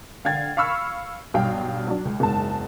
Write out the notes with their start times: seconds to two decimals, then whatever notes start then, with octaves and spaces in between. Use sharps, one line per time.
0.25 D3 F5 G5 G#6 A6
0.57 F5 B5 C#6 E6 F6
1.34 B1 G2 F5 G5
1.87 F#3 D4
2.05 C#2
2.20 F#1 E2 G#2 A5